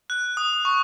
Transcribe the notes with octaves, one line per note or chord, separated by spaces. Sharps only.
F#6
D#6
C#6